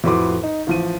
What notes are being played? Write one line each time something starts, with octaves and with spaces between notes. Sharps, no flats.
F2 A2 F#4 B4 C6 D6
D#4
A1 F3 D#7